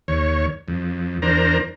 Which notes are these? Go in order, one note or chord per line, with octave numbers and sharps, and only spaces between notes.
D#2 C#5
F2
E2 D4 A#4 C5 A#5